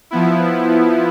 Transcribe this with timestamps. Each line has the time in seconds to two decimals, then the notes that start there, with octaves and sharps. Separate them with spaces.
0.11 F3 B3 E4